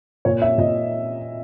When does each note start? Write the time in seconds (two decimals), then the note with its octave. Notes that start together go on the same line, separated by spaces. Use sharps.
0.25 A#2 C#5
0.42 E5
0.58 A#2 D#5